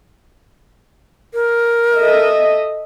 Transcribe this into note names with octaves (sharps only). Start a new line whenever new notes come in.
A#4
A4 D#5 E5